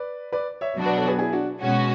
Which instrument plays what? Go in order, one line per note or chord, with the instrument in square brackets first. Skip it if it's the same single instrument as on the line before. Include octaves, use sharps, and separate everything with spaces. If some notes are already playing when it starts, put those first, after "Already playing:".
Already playing: [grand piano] B4 D5
B4 D5
C#5 E5
[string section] B2 F#3 B3 D4 F#4
[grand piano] B4 D5
A4 C#5
G#4 B4
E4 G#4
D4 F#4
[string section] B2 G#3 C#4 F#4